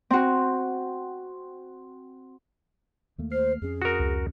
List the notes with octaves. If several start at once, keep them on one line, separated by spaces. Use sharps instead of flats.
C4 F#4
D#2 A3 A#3
C5 F6 C7
F2 C#4 G#4
F#4 A#4 D#6
C#2